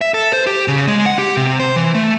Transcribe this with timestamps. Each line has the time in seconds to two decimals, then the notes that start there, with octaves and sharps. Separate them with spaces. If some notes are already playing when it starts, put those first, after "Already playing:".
0.01 E5
0.14 A4
0.33 C5
0.47 G4
0.68 C#3
0.88 G#3
1.06 F#5
1.19 G4
1.37 C3
1.60 C5
1.76 E3
1.95 A3